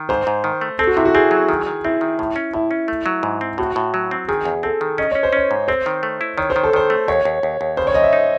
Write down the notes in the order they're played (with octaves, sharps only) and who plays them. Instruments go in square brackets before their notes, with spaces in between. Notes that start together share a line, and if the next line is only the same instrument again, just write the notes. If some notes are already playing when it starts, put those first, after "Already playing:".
Already playing: [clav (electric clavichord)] D#3
[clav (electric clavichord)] G#2 [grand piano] C5
[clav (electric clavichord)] G#2
D#3
A3
[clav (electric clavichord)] C4 [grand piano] A4
[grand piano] F#4
[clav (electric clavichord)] C3 [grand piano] E4
[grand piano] F#4
[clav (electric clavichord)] C4 [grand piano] G#4
[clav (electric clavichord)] F#3
D#3
D#3
[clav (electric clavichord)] C4 [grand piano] E4
[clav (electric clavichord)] D#3
A2
C#4
[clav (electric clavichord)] A2 [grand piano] E4
[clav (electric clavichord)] C#4
A3
F#3
G#2
C4
[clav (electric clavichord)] A2 [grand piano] F#4
[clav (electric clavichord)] A2
F#3
C4
[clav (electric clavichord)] D#3 [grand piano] G#4
[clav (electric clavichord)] E2
[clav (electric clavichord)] C4 [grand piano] A4
[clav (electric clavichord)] D#3
[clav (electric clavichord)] C#4 [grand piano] D#5
[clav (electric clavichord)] C#4 [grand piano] C#5
[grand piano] C5
[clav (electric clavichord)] C#4 [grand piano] C#5
[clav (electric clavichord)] G#2
[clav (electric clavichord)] C4 [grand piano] C5
[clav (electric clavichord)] D#3
A3
E4
[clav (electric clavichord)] D#3 [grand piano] C#5
[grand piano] C5
[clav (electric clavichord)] D#3
[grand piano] A4
[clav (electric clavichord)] D#3 [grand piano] C5
[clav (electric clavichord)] A3
[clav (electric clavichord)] D#2 [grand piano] C#5
[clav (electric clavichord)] D#2
D#2
D#2
[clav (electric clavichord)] C#3 [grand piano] C5
[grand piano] C#5
[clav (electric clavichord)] F#2 [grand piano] D#5
[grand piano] E5
[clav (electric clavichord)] D#4